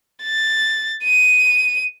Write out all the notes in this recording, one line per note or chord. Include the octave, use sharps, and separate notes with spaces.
A6
D#7